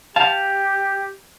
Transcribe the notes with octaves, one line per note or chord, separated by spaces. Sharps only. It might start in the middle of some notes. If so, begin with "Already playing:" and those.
G4 F5 A5